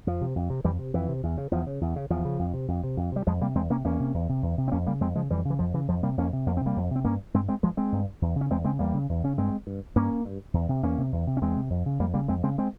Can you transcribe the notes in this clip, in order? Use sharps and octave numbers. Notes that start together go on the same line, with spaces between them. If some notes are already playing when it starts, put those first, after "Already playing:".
F2 F3
C3
F2
C3
F2 E3 G3
C3
F2 E3
C3
E2
C#3
E2 F3
C#3
E2
C#3
E2 F3
C#3
F2
C3
F2
C3
F2
C3 G3
F2 F3 G#3
C3 G3 A#3
E2 G#3 C4
C3 A#3 C#4
E2 A#3 C#4
C3
E2
C3
E2
C3
C4
F2 A#3 C#4
C#3 G3 A#3
F2 G#3 C4
C#3 F3 G#3
F2 E3 G3
C#3
E3
F2 F3
C#3 E3
F2 F3
C3 G3 A#3
F2 A#3 C#4
C3
F2 A#3
C3 C4
G3 A#3
F2
C3 C4
G2 A#3 C#4
G2 G#3 C4
G#3 C4
G2 F3 G#3
G#3 C4
G2
E2
C#3
C#4
E2 G#3 C4
C#3 G#3 C4
E2 G3 A#3
C#3
E2
C#3 C#4
G2 G#3 C4
G2
G2 A#3 C#4
G2
E2
C3
E2 A#3 C#4
C3
E2
C3
C#4
E2 G#3 C4
C3
F2
C#3
F2 G3 A#3
C#3 G3 A#3
F2 G#3 C4
C#3 G#3 C4
G#3 C4